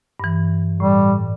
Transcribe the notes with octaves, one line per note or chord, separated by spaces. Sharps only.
G2 E3
A2 G3